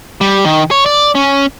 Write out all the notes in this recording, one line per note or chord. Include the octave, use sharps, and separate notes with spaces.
G3
D#3
C#5
D5
C#4